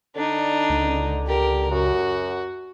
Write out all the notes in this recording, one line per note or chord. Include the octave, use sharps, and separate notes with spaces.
D3 D4 D#4
C#2
G4 A#4
F#2 F#4